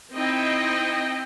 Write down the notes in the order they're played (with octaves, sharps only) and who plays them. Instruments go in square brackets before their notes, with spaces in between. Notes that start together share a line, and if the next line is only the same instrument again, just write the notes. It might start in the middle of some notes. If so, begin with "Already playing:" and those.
[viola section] C4 D#4 E4 D#5 G5